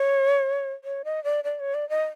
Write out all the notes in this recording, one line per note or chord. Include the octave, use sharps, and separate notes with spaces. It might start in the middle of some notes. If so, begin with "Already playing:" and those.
Already playing: C#5
C#5
D#5
D5
D5
C#5
D5
D#5